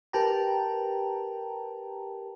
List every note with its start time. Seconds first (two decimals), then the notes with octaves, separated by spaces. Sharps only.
0.13 G4 A#4 B4 G5 A5 A#5